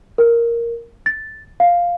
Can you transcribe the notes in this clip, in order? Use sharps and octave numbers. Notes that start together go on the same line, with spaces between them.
A#4
A6
F5